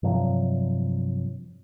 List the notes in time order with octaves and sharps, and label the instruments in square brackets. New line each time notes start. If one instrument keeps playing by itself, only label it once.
[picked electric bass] G2 C3 F3 F#3